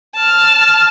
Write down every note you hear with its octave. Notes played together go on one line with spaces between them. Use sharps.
A5 F6